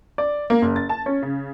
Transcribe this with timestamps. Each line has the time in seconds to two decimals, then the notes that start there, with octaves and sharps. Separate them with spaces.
0.18 D5
0.50 A#3
0.62 F#1
0.76 A6
0.89 A5
1.06 C#4
1.23 C#3